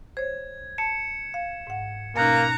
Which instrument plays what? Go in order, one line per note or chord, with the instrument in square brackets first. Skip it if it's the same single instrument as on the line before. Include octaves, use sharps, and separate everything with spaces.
[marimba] C5 C#5 [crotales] G#6
[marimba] A5 [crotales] C#7 E7
[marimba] F5
G#2 F#5
[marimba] B2 C#4 D#4 [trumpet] A#3 [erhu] A#5 [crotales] F#6 C#7